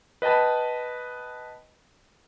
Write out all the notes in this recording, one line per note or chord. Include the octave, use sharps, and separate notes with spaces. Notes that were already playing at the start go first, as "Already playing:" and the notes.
B4 D#5 G5 A5 B5